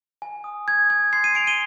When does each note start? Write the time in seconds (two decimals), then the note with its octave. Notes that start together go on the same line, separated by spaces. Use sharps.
0.22 G#5
0.44 D#6
0.68 D#6 G#6
0.90 G#5 G#6
1.13 C6 G#6 C7
1.24 C7 D#7
1.35 G#5 D7 F7
1.47 D#7 G7